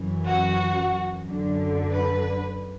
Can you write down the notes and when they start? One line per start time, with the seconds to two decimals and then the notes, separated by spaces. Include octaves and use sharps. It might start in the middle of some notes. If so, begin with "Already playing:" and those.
Already playing: F#2 E3
0.25 F#4
1.24 F#2 D3
1.92 B4